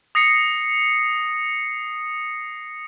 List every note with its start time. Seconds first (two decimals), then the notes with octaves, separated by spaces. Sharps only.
0.15 D#6 A#6 C7 C#7